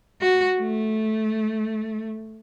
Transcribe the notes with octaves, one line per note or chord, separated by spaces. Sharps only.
F#4
A3